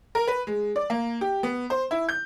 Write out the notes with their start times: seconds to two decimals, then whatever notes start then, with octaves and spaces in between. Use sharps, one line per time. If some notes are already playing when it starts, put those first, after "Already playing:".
0.15 A#4
0.27 B4
0.47 G#3
0.76 D5
0.90 A#3
1.21 G4
1.43 B3
1.70 C5
1.91 E4
2.09 G6